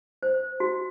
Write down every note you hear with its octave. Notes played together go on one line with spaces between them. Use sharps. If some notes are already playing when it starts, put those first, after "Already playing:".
C5
F#4